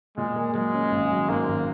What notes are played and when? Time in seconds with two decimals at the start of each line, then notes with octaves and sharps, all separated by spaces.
0.17 A#2 G#3
0.36 A#3
0.54 F#3 G#3
0.73 C#4
0.91 G#1
1.11 F#3
1.29 G#2 A#3
1.48 G#1